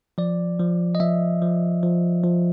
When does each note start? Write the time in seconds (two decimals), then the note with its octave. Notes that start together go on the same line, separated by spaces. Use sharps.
0.18 F3 D5
0.60 F3
0.95 D#5
1.00 F3 E5
1.42 F3
1.83 F3
2.24 F3